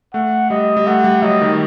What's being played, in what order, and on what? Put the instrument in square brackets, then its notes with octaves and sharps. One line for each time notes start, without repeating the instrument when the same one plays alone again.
[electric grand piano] A3 [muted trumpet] F#5
[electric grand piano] G3 [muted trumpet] D#5
[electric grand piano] G3
[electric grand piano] A3 [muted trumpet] F#5
[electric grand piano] G3
[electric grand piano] F#3 [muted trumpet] D#5
[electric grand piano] D#3